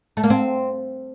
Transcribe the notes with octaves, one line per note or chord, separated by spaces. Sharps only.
A3
A#3
C4